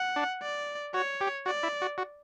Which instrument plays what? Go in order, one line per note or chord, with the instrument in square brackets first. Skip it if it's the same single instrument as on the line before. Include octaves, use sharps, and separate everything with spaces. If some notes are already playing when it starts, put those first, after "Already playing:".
Already playing: [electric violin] F#5
[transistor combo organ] D4
[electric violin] D5
[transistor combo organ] F#4 [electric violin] C#5
[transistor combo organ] G4
[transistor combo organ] F#4 [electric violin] D5
[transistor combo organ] E4
F#4
F#4